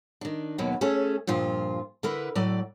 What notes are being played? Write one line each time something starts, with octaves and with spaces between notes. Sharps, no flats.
D#3 D4
D#2 B2 F#3 A#3 B3
A3 C#4 G#4 A4
G2 A#2 F3 F4
D3 E4 A#4 B4
A2 F#3 D5